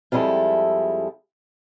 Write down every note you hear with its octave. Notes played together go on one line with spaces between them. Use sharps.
F2 G3 G#3 E4 A4